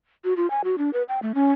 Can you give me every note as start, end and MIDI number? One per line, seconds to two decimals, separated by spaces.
0.24 0.34 66
0.37 0.49 65
0.50 0.61 80
0.64 0.76 66
0.78 0.90 62
0.93 1.03 71
1.09 1.19 79
1.22 1.32 57
1.35 1.52 61